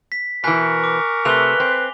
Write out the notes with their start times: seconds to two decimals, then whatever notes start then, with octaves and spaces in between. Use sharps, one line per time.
0.12 B6
0.44 B2 E3 A#4 G#5 C#6 F#6 B6
0.84 D6
1.25 C3 A3 B4 F7 G7
1.60 C4